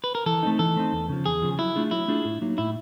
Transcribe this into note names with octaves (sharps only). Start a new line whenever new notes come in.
B4
A#4
E3 A4
A3 C4 D#4
E3 A4
A3 C4 D#4
E2
C#3 F3
E2 G#4
C#3 F3
F#3 E4
A3 D4 F4 G#4
F#3 E4
A3 D4 F4 G#4
A2
F#3 A#3 D#4
A2 E4